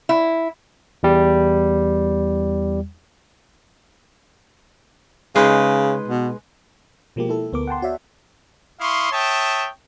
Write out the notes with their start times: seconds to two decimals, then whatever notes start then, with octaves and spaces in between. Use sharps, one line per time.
0.09 E4
1.03 E2 G3
5.36 C#3 G#3 D#4 B4
6.08 B2
7.16 B2 F3 G#3 A#3 G4
7.29 E4 A4
7.53 D2 B3 A#4 D6
7.67 F#5 G5 A5 C6
7.82 F#4 C#5 D5 E5 F#5
8.80 E4 F5 C6 C#6 D#6
9.12 C#5 E5 G5 A5 D#6